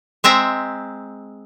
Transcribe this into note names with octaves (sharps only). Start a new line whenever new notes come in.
G#3 C4 E5 A#5